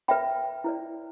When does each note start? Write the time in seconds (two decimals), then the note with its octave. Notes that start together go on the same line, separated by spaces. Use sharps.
0.08 B4 E5 G5 B5
0.64 E4 B4 D5